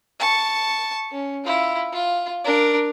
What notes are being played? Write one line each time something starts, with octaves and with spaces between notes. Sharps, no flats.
A5 C#6
C#4
E4 F4
F4
D4 A#4